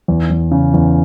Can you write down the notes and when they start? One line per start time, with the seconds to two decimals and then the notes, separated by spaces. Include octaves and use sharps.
0.08 E2
0.30 E2
0.51 C#3
0.74 E2